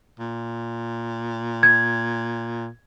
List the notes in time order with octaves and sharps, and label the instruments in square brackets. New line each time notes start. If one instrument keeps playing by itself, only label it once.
[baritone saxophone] A#2
[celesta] G#6